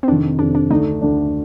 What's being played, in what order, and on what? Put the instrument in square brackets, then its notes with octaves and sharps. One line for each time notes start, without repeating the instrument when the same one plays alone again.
[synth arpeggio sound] C4
[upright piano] F2 C3 D#3 [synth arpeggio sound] D4
[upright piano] F2 C3 D#3 [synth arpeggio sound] D4
[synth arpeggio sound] D4
[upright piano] D2 D3 A3 D4 [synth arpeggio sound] D#4
[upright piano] D2 D3 A3 D4